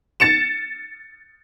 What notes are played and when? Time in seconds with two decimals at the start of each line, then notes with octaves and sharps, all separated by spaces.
0.20 A6 C#7 E7